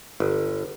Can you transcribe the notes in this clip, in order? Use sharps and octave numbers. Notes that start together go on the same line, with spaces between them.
G1